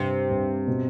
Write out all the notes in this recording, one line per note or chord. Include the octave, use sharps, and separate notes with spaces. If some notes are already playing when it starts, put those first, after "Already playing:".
Already playing: G2 C3
G2
B2